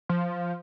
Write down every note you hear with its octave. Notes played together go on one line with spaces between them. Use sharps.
F3